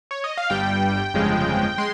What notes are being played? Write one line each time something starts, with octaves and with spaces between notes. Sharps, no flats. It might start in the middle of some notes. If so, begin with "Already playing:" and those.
C#5
D#5
F5
G1 G2 G3 G5
G1 F2 C#3 F3 G#3
G#3 C6